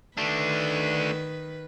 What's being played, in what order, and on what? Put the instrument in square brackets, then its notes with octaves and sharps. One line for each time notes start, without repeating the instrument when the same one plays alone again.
[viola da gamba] D#3 B4 [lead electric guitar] A3 D4